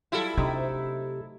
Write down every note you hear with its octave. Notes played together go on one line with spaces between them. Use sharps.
F#3 G3 E4 F4 A4
C3 A3 D4 D#4